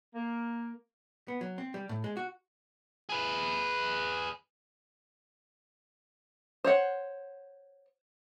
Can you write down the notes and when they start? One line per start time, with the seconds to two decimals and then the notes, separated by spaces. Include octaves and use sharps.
0.14 A#3
1.28 B3
1.41 F#3
1.58 C4
1.74 G3
1.89 A2
2.04 G#3
2.17 F#4
3.09 G#4 B4
6.64 C5 C#5 F#5